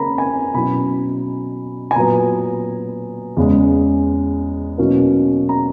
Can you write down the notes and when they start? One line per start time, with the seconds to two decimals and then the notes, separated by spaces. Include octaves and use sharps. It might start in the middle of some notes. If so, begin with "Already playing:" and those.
Already playing: C#3 A#3 A#5 B5
0.18 G#5
0.54 B2 F#3 C#4 E4 B5
1.91 G#5
1.96 A#2 F#3 B3 A#5
3.37 E2 C#3 G#3
4.78 B2 F#3 A#3 C#4 E4
5.49 A#5